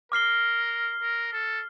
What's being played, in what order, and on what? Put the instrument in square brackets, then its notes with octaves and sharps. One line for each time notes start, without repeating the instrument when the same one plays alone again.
[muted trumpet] A#4 [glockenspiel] D6 F6 C7 G7
[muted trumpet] A#4
A4